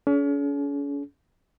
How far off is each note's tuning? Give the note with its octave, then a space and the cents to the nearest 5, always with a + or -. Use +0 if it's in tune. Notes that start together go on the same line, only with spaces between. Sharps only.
C#4 +40 G#4 +45